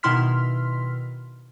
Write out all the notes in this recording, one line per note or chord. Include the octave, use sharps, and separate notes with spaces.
B2 D#3 E4 C6 F6 B6